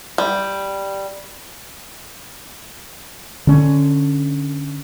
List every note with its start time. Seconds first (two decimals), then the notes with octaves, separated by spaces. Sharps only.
0.18 G3
3.47 D3 C#4